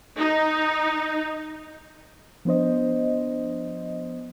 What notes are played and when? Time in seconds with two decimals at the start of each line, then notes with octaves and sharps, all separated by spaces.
0.18 D#4
2.45 F3 B3 D4 C5 D#5